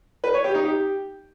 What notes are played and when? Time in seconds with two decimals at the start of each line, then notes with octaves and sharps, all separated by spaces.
0.24 B4
0.34 C#5
0.44 G4
0.54 D#4
0.65 G4